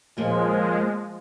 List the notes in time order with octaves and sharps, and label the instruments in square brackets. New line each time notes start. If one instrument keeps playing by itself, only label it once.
[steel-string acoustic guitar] D#2 A#2 A#3 [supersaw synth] F3 G#3